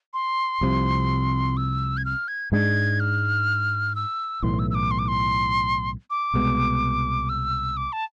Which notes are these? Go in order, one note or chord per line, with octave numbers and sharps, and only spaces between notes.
C6
C2 C3 F3
E6
G#6
F6
G#6
G#2 G#3 D4 G#6
F6
E6
B1 A2 E3 C6
E6
E6
D6
C6
D6
C6
D6
C2 B2 G#3 B3
E6
D6
A5